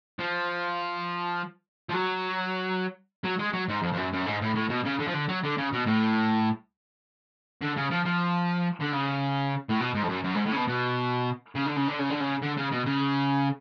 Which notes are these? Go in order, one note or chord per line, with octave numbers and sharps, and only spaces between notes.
F3
F3
F#3
F#3
G#3
F#3
G#2
F2
F2
F#2
F#2
G#2
A2
A2
B2
C#3
D3
F3
D3
F#3
D3
C#3
B2
A2
D3
C#3
F3
F3
D3
C#3
A2
B2
G#2
F2
F#2
F#2
G#2
A2
C#3
B2
B2
C#3
D3
C#3
D3
C#3
D3
C#3
D3
C#3
B2
C#3